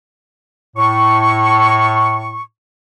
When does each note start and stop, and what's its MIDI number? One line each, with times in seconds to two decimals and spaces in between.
0.76 2.41 45
0.76 2.41 85